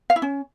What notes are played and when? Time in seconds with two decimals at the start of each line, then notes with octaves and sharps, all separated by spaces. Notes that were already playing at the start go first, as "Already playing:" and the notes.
0.10 F5
0.16 E4
0.22 C#4